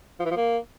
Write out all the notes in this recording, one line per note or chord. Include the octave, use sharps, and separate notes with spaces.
F3
E3
F3
A#3